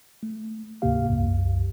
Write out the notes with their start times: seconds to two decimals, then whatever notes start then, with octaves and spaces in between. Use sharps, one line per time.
0.23 A3
0.82 D2 G#2 C3 A#3 G4 F5
1.08 C2 F#2